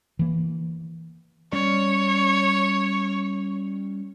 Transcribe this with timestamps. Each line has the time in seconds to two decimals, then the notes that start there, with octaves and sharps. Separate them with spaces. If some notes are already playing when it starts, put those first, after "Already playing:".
0.19 E3 A#3
1.52 G3 C#4 C#5 D5